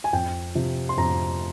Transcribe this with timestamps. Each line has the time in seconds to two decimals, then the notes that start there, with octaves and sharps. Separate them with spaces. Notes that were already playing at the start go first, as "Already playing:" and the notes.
0.04 G#5
0.13 F2 G5
0.55 C3 F3
0.89 C6
0.98 F2 A#5